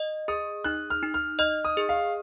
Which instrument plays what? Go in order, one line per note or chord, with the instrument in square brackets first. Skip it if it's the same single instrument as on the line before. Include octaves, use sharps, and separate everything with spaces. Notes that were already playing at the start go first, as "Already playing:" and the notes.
Already playing: [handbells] D#5
[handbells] G#4 [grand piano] D#6
[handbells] D#4 [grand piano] F#6
[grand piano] F6
[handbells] D#4
[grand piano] F6
[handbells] D#5 [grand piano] F6
[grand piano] D#6
[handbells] G#4
[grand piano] F5